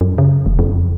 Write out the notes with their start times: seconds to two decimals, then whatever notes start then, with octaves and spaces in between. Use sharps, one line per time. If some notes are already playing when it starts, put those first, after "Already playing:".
0.01 F#2
0.18 C#3
0.46 F1
0.59 F2